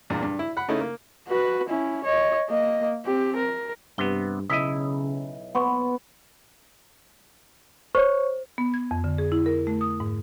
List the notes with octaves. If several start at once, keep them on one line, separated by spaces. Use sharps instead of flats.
E2 G2 A#2
G2
E4
F#5 B5
C#3 A3 C#4 D#4 E4
A#3
F#4 B4
C#4 E4
C#5 D#5
A#3 D#5
C4 G4
A#4
G2 C3 B3 G7
B1 C#3 E4 D#5 D#6 E6 B6
B3 F#5 C6 C#6
C5 C#5 C#6
B3
G#6
F2
D3
G#4
E4
A#4
A3
D#6
G#2